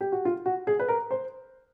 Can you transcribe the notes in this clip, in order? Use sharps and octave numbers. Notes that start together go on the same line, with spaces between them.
G4
F#4
F4
F#4
G#4
B4
A#4
C5